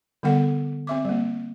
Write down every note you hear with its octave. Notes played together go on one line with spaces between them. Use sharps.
D3 G3 B3 A4 F#5
C4 E5 D6
G3 A#3